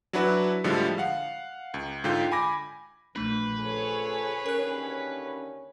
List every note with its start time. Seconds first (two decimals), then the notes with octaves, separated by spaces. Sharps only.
0.13 F#3 D4 E4 F#4 B4
0.64 A2 D3 F3 G3 G#3
0.98 F5 F#5
1.74 C#2
2.04 G#2 D3 F4 G5 G6
2.32 G#5 B5 D6 A#6
3.16 A#1 A#2 A3 D4 B4
3.59 C#3 F3 G#4 A4 C#5
4.46 D#2 D3 C#4 A#4 F#6